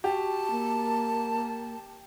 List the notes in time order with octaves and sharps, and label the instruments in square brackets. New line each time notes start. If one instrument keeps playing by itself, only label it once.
[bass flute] F#4 [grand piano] G4 [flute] A5
[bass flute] A#3